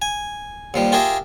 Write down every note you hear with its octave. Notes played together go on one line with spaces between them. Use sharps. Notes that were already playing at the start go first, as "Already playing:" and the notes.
G#5
D#2 F3 G3
F4 G4 G#4 A#4 E5